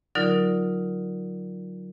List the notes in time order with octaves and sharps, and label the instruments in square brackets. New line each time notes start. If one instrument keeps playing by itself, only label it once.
[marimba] D3 F#3 D#4 F4 A#4 D5